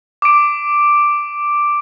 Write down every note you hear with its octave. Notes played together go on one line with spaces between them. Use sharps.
D6 D7